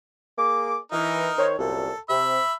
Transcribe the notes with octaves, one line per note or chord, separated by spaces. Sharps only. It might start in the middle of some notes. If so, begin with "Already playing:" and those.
A#3 G#4 D6
E3 D#4 A#4
D#3 C5 C#5
C2 F#2 A#2 A4
C3 E5 B5